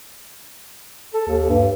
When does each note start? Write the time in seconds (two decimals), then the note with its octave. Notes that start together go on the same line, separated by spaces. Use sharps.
1.14 A4
1.28 D#2
1.49 G2